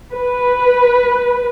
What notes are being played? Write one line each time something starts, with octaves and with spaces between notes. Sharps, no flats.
B4